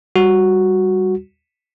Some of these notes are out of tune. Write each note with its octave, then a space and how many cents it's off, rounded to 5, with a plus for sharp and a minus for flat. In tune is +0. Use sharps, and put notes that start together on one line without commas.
G3 +0 F#4 +0